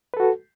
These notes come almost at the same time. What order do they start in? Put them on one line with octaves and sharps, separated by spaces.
B4 A4 F#4